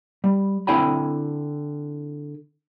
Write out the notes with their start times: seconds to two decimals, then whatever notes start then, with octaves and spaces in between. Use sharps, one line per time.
0.24 G3
0.67 D3 C4 E4 G5 G#5 B5